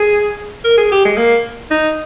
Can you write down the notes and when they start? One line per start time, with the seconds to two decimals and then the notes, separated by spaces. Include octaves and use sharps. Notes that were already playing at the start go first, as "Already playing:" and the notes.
Already playing: G#4
0.64 A#4
0.78 G#4
0.92 G4
1.05 G#3
1.17 A#3
1.71 D#4